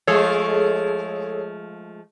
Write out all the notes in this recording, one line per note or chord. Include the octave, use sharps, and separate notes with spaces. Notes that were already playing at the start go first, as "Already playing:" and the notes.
F3 G#3 A3 G#4 A4 C#5